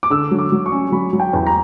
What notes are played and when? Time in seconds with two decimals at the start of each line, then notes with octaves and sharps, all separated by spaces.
0.03 D6
0.10 D3 E6
0.31 F#3
0.39 D6
0.52 F#3
0.66 C#6
0.72 C#4
0.92 F#3 B5
1.13 F#3
1.20 G5
1.33 E2
1.46 A#5